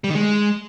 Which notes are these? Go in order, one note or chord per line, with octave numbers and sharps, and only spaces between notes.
G3
D#3
G#3